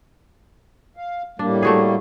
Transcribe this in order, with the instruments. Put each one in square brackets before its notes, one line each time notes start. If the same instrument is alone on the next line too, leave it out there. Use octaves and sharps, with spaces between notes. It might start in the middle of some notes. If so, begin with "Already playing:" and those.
[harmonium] F5
[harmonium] A2 G3 A#3 [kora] D4
[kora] A3 F#4 G#4